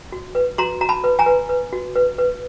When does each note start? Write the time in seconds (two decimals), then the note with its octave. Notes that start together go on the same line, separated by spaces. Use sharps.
0.12 F#4
0.35 B4
0.58 F#4 A#5 C6
0.81 F#4 A#5
0.89 A5 B5
1.04 B4
1.19 G#5 A#5
1.26 B4
1.49 B4
1.73 F#4
1.95 B4
2.18 B4